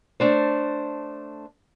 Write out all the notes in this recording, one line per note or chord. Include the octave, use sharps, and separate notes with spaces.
A3 D4 C5